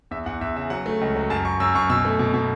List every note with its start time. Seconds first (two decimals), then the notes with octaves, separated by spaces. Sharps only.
0.11 E2 E5
0.26 E2 F#5
0.41 E2 E5
0.56 C#3 E5
0.70 F#3 F#5
0.86 A3
1.01 C#2
1.16 F#3
1.30 F#2 A5
1.45 F#2 C#6
1.60 F#2 E6
1.74 F#2 C#6
1.90 B2 E6
2.05 A3
2.19 B2
2.34 B2